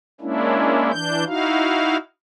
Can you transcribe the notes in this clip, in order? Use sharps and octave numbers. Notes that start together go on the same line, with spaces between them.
G#3 A#3 C#4 D4 E4
E3 D4 G6
D#4 E4 F#4 F5